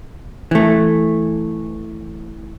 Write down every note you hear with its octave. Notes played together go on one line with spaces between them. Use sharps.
E3 A3